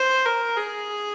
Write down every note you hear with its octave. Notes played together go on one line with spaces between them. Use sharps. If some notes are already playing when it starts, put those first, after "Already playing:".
Already playing: C5
A#4
G#4